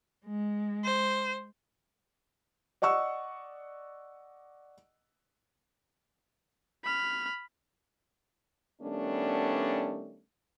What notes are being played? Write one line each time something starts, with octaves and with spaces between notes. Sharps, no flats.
G#3
C5
D5 D#5 F#5 C#6 E6
B5 F6
D#3 G3 A3 B3 C#4 D4